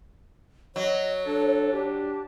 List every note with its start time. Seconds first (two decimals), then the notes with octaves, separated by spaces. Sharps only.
0.76 F#3 C#5 D#5
1.26 D4 A4
1.72 D4 G4